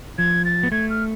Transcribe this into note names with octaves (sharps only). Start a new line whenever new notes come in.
F3 G#6
A6
B3
A3 G#6
F6